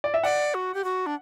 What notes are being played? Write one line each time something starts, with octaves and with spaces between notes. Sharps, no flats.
D5
E5
D5 F#5
F#4
G4
F#4
D4